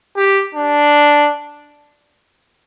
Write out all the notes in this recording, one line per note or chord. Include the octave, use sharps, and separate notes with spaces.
G4
D4